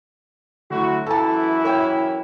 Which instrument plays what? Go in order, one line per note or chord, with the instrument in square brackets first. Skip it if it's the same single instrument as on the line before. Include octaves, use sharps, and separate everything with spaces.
[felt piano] D2 [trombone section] F#3 E4 F#4
[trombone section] F#2 E3 E4 [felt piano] A4 A5
[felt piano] A#4 C#5 G5